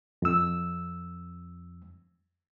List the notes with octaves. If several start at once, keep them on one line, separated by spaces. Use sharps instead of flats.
F2 E6